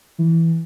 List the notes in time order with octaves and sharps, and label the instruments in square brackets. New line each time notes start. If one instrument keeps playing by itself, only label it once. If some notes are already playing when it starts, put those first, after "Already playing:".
[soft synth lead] E3